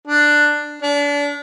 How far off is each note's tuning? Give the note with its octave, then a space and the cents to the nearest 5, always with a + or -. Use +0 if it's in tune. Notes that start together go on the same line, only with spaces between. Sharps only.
D4 +10
D4 -30